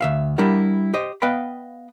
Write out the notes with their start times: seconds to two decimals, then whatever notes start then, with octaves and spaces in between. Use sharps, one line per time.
0.01 D2 E5 F5
0.38 G3 D4 E4 G4 A#4 F#5
0.94 G4 C5 D#5
1.22 B3 B4 D#5 F5 G5 B5